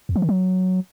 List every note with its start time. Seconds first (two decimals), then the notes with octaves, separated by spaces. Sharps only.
0.09 E2
0.16 F3
0.22 D#3
0.29 F#3